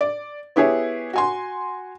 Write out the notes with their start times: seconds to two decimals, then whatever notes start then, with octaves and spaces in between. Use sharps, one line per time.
0.01 D5
0.56 B3 E4 G4 G#4 C#5
1.13 F#4 G#5 C6